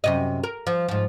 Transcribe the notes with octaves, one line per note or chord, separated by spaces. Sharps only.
F#2 C3 D#5
A#4
F3
G#2 F3